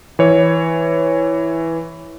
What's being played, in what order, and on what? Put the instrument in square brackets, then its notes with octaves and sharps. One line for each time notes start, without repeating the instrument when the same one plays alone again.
[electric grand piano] E3 C#5